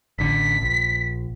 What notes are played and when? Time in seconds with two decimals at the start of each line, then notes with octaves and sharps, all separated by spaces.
0.19 A1 D3 B6
0.61 A#1